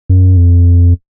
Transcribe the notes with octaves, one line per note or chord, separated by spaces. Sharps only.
F#2
F2